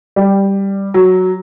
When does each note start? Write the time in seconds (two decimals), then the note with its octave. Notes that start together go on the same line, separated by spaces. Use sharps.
0.16 G3
0.94 F#3